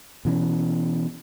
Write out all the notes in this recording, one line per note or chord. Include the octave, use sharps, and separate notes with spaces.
B2 E3 C#4